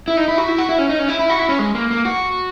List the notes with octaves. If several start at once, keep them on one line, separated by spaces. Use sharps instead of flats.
E4
D#4
E4
F#4
E4
F#4
E4
C#4
D#4
C#4
E4
E4
F#4
E4
C#4
G#3
A#3
A#3
F#4